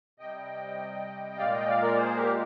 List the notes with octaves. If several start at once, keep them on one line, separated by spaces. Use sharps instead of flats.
C3 G3 D#5 G5
A#2 G#3 D5 F5
D#5 G5
D5 F5
A#4 D5
G#4 C5
G4 A#4